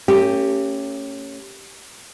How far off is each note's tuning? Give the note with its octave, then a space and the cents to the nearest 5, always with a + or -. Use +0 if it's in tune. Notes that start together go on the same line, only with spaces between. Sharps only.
A3 +45 C#4 +0 G4 +0